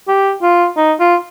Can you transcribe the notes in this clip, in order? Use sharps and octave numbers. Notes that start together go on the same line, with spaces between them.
G4
F4
D#4
F4